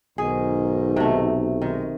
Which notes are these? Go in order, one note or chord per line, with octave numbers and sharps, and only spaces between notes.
B1 G#2 D#3 G#4
C3 A3
D#3 G#3